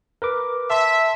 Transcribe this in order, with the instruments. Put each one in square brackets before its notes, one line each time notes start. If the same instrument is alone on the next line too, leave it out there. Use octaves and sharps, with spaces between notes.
[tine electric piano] A#4 B4 D6
[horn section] E5 [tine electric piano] A5 C6